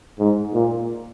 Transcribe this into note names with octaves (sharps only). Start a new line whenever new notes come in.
G#2
A#2